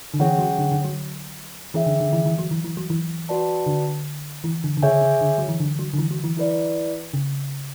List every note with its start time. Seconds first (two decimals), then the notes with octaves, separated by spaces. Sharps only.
0.14 D3
0.19 E3 C#4 G#4 C#5 F#5
0.39 F#3
0.59 D3
0.72 D3
0.84 F#3
1.74 E3 C#4 G#4 C#5 E5
1.86 D3
2.00 D3
2.13 E3
2.26 E3
2.38 F#3
2.51 E3
2.64 E3
2.77 F#3
2.90 E3
3.29 F#4 B4 D5 A5
3.66 D3
4.44 E3
4.64 D3
4.77 D3
4.83 C#3 G#4 C#5 E5 G#5
5.01 C#3
5.21 D3
5.38 F#3
5.49 E3
5.60 D3
5.79 F#3
5.94 D3
5.98 E3
6.11 F#3
6.24 E3
6.37 E4 B4 D5
7.14 C#3